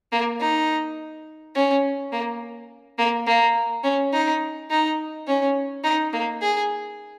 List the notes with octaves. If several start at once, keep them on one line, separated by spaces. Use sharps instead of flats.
A#3
D#4
C#4
A#3
A#3
A#3
C#4
D#4
D#4
C#4
D#4
A#3
G#4